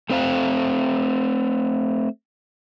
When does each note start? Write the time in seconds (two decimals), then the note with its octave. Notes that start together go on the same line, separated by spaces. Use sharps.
0.10 A3 C4 C5 F5